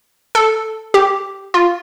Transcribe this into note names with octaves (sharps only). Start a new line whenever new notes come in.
A4
G4
F4